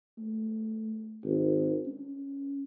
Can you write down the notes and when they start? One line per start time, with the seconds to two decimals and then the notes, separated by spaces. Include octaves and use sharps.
0.18 A3
1.24 G#1
1.86 C#4